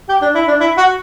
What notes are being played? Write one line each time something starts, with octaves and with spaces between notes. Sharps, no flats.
G4
D4
E4
D4
E4
F#4